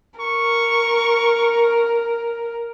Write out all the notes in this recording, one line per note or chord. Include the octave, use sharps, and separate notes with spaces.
A#4 C#6